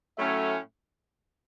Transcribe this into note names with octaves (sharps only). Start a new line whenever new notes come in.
A2 F#3 A3 C#4 E5